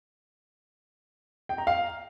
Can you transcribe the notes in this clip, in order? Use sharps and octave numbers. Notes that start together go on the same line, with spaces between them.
G5
A#5
F5